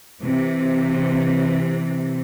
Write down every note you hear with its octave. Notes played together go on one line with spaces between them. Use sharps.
C3 E3